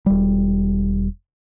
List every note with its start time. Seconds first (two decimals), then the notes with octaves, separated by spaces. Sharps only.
0.06 E1 G3